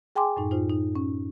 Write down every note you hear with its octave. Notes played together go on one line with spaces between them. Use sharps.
G#4 G5 G#5 C6 D6
F#2 A2 D#4
D#4 F4 C5
D#4
C#4